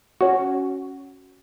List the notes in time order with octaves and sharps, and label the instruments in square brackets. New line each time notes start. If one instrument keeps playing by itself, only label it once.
[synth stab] C#4 F#4